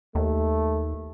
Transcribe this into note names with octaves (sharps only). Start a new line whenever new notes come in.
D#2 A3